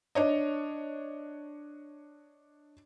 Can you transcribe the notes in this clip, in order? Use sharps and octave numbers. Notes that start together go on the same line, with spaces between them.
D4 C#5 D#5